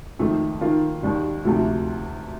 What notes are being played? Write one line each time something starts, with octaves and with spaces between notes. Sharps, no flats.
F2 D#3 A3
D#3 A#3 F4
D#2 D#3 G3
D2 C3 F3 A3